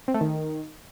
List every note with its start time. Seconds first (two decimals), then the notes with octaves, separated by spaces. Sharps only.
0.08 C4
0.14 A3
0.21 D#3